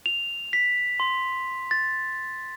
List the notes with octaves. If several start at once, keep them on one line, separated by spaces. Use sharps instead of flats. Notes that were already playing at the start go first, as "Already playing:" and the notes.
F7
B6
C6
A6